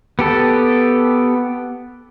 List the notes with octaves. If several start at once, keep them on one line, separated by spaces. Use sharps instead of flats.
B3 G4 A4